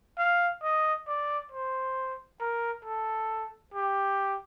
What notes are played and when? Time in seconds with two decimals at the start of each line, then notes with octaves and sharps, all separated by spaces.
0.18 F5
0.63 D#5
1.07 D5
1.52 C5
2.40 A#4
2.85 A4
3.74 G4